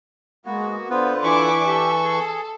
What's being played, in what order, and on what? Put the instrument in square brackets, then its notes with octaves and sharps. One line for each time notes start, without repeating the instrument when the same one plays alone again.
[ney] G#3 [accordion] A#3 B3 F#4
[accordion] D3 F4 B4 [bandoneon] B3 [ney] C5
[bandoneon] E3 C#6 [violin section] D4 E4 D6 [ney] G#5
[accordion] G4 E5 [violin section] A4
[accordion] G#4